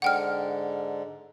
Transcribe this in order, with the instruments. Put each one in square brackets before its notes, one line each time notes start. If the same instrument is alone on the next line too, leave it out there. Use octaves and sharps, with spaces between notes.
[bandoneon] G#2 D3 [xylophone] F#5 G5 F6